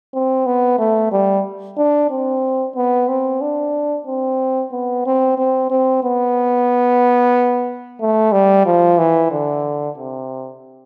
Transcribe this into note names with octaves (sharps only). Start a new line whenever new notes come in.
C4
B3
A3
G3
D4
C4
B3
C4
D4
C4
B3
C4
C4
C4
B3
A3
G3
F3
E3
D3
C3